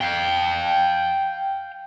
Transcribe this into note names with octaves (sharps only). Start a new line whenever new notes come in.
F5 G5